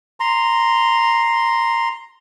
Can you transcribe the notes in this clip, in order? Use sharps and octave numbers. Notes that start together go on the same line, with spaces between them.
A#5 C6